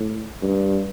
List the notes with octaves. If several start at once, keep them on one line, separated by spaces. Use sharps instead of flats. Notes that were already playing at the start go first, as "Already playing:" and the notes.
Already playing: A2
G2